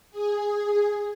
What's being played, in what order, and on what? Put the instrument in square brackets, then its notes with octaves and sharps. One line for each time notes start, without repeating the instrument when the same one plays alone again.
[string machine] G#4